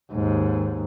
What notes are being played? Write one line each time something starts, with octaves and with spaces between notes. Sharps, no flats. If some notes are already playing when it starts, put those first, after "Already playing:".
D#2 G#2